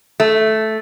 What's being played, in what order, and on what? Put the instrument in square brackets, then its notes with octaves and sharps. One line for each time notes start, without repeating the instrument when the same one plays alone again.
[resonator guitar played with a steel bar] A3